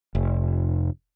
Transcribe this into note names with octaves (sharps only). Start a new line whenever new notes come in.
F1